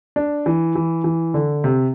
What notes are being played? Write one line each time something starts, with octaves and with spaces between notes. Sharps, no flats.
D4
E3
E3
E3
D3
C3